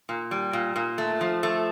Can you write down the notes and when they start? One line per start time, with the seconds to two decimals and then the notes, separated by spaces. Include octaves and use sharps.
0.09 A#2
0.31 G3
0.53 A#2
0.76 A#2
0.98 A3
1.21 F3
1.43 A3